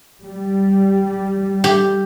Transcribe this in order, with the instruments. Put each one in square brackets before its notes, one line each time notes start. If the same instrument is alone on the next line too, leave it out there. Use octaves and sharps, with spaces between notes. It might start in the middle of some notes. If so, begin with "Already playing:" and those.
[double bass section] G3
[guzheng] G4